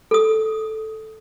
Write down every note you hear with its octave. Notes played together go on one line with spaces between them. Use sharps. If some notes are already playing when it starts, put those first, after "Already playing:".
A4 D#6